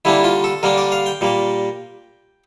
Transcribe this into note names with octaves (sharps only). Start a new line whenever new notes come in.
D3 G3 A#3 D4 E4
F4
A4
D3 G3 A#3 D4 A#4
D5
F5
G5
A#2 G3 A#3